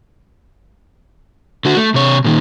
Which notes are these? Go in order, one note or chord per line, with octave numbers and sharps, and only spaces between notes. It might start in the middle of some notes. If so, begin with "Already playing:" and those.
D3 F#4
A3
C3 C#5
A#2 D#3